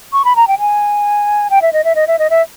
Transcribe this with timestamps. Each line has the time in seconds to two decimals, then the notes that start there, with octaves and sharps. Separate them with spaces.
0.13 C#6
0.25 B5
0.36 A#5
0.48 G5
0.59 G#5
1.50 G5
1.62 E5
1.73 D#5
1.84 E5
1.95 D#5
2.07 E5
2.19 D#5
2.30 E5